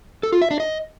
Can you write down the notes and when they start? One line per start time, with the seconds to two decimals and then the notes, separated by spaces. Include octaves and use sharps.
0.23 A4
0.32 F4
0.42 E5
0.51 D4
0.60 D#5